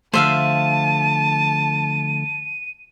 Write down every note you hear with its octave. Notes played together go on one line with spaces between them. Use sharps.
D3 F3 A3 C5 E5 F5 A5 D#7